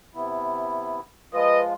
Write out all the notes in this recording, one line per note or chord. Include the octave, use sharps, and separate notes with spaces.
C3 B3 E4
F3 G#3 F4 B4 D#5